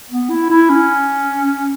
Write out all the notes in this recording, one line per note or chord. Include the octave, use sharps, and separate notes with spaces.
B3
E4
E4
C#4